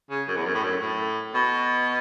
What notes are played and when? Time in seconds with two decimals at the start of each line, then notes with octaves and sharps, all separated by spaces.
0.10 C#3
0.28 F#2
0.36 E2
0.46 F#2
0.55 A2
0.63 F#2
0.81 A2
1.35 B2